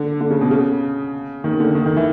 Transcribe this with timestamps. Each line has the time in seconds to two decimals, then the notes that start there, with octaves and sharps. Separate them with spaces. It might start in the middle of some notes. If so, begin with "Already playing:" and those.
Already playing: D3
0.21 D3
0.31 C#3
0.41 B2
0.51 C#3
1.44 D#3
1.60 D3
1.75 D#3
1.86 D#3
1.96 E3